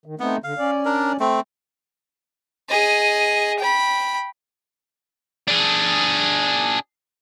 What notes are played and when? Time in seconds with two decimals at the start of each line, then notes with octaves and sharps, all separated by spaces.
0.06 D#3
0.20 A3 B3 C4 D#4
0.44 D3 F5
0.59 C#4 D5
0.85 D4 A#4
1.20 A3 C4
2.69 G#4 D#5
3.59 G5 B5
5.48 D4 G#4